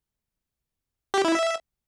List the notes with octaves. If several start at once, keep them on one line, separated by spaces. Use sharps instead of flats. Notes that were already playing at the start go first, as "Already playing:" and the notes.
G4
E4
E5